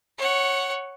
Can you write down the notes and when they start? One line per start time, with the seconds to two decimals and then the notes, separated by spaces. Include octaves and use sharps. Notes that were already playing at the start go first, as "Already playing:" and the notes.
0.18 C#5 F#5